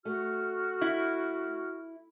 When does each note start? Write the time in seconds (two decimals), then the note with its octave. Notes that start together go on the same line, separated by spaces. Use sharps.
0.05 A3 F#4 F6
0.82 E4